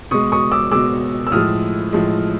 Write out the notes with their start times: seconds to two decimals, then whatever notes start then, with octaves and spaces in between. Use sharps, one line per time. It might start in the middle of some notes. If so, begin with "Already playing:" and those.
0.11 B2 G#3 C#6 D#6
0.32 C#6 D#6
0.51 D6 E6
0.71 B2 G#3 D6 E6
1.27 E6
1.32 A2 F3 G#3 D#6 F6
1.93 A2 F3 G#3